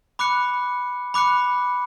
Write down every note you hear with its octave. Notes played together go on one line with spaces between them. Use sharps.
B5 D6 F#6 C#7
B5 D6 F#6 C#7